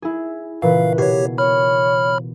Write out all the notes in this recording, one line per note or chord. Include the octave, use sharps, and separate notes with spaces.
E4 G#4
A#2 C#3 E3 B4 F5
B2 G4 C#5 G#6 C7
C#5 B5 F6